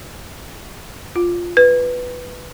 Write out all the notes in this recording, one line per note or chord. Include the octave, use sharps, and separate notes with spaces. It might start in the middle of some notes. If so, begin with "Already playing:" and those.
F4
B4